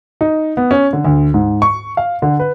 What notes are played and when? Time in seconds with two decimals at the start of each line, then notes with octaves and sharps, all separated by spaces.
0.21 D#4
0.57 B3
0.71 C#4
0.93 D3
1.05 D2
1.34 G#2
1.62 C#6
1.97 F5
2.22 D3
2.40 B4